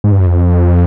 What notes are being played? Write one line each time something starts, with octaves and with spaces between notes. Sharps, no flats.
G#2
G2
F#2
F2